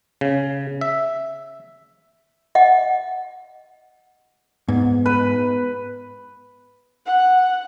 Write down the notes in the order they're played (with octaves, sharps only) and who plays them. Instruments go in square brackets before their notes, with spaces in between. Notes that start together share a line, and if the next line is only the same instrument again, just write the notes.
[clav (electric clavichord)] C#3
E5
[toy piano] D#5 F#5
[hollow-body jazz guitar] G#2 [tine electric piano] B3
[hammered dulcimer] B4
[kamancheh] F#5